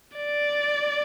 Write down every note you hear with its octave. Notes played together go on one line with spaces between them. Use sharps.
D5